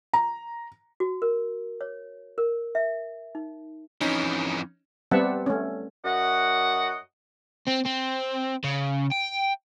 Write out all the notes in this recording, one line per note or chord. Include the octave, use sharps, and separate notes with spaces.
A#5
F#4
A#4
C#5
A#4
E5
D#4
F2 E3 C#4 D#4
G3 B3 C4 E5 F#5 A5
A3 C#4
F#2 F#4 D#5 F#5
C4
C4
C#3
G5